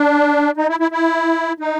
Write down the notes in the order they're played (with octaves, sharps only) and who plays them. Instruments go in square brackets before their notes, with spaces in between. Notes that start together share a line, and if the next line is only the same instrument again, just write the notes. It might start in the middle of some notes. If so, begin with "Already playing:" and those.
Already playing: [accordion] D4
D#4
E4
E4
E4
D#4